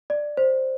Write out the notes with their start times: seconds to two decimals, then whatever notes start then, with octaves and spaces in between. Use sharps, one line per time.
0.10 D5
0.37 C5